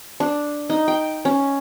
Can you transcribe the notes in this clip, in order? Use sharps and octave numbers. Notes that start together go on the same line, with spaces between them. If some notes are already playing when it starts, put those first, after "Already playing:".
D4
D#4
G5
C#4